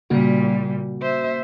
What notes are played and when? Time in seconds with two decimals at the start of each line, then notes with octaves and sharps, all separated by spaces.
0.10 A#2 C#3 G3 A#3 F#4
1.02 C5 E5